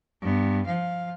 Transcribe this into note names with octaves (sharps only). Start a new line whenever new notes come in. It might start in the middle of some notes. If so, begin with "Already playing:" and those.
G2 B3
F3 F5